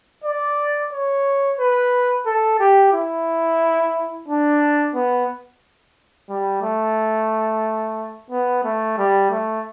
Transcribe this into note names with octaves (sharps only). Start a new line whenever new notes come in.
D5
C#5
B4
A4
G4
E4
D4
B3
G3
A3
B3
A3
G3
A3